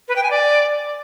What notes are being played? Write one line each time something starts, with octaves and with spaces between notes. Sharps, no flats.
B4
G5
G#5
D5